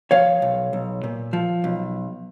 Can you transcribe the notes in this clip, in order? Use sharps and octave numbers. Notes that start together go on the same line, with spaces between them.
F3 C#5 F5
B1
B1
A#2
F3
B1